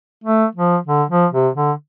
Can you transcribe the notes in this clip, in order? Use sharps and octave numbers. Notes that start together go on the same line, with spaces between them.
A3
F3
D3
F3
C3
D3